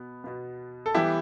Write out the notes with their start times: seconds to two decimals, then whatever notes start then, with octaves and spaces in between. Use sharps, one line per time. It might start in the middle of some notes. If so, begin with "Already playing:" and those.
Already playing: B2 B3
0.24 B2 B3
0.86 A4
0.95 E3 G3 B3 E4 G4